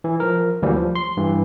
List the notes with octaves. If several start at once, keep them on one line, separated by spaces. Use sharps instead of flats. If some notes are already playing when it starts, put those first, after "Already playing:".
E3
F3 A#4
D2 E3 F#3 G3 A#3
F3
C6
G2 E3